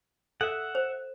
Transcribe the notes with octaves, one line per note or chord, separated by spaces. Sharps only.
A4 E5 F#5
C5